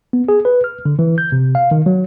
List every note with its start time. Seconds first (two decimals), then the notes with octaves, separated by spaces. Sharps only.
0.13 B3
0.29 G#4
0.45 B4
0.64 F6
0.86 D3
0.99 E3
1.18 G6
1.32 C3
1.55 F5
1.71 D#3
1.86 F#3